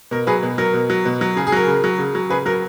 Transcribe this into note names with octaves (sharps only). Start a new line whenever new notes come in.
B2 A#4
F#3 G#4 B4
B2
F#3 A#4
B2
F#3
B2
F#3
C#3 G#4
G#4
F#3 A#4
C#3
F#3
C#3
F#3
C#3 G#4 B4
F#3 A#4